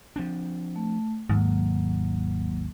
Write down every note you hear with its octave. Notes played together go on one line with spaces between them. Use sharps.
F3 C4 D4
A3
G#1 D#2 G#2 F#3 A#3